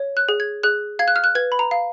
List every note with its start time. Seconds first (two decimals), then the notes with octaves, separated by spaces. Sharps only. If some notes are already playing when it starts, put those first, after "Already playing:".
Already playing: C#5
0.17 F#6
0.29 G#4
0.40 G#6
0.63 G#4 F#6
0.99 F5 G#6
1.08 F#6
1.16 F6
1.24 F#6
1.35 B4 G#6
1.52 B5
1.59 A#5
1.71 F5